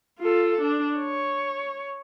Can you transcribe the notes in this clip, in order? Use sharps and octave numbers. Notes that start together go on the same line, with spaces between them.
F4 A4
D4
C#5